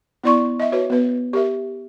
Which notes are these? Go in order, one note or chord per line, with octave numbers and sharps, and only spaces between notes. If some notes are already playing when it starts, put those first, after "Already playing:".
B3 E4 D5 C6 C#6
D#5 E5
F#4 B4 C#5
B3 B4
G4 A#4 E5